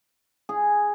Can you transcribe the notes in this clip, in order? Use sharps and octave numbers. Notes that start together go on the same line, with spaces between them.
G#4